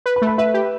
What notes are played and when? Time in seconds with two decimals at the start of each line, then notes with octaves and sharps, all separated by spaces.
0.06 B4
0.16 B5
0.22 A3
0.27 B5
0.38 B4 E5
0.54 G4